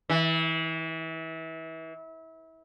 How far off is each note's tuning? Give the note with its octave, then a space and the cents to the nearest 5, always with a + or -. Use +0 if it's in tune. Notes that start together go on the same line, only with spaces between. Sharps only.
E3 -30